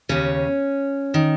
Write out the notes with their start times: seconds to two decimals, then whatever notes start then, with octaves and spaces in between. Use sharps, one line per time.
0.09 D#2 C#3 C#4
1.14 D#3